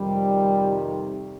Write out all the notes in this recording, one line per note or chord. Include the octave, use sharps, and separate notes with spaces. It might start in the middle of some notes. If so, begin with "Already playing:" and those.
Already playing: F2 C3 D#3 G3